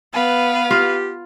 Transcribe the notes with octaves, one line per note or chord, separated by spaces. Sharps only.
B3 B4 F5
F4 G4